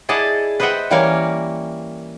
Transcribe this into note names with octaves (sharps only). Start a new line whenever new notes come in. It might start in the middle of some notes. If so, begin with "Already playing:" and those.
E4 G#4 D5 D#5 F#5 A5
B4 C5 D#5 E5 F#5 G5
E3 G3 A#3 C#4 A#4 C#5